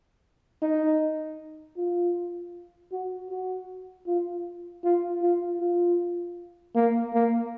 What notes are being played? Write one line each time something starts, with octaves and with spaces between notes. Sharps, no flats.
D#4
F4
F#4
F#4
F4
F4
F4
F4
A#3
A#3